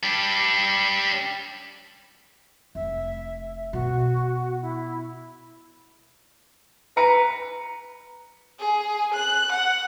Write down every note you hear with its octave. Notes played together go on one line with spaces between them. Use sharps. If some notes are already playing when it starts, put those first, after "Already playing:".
G3 D4
F1 E5
B2 F#4
E4
B4 A#5 C#7
G#4
F#6
F#5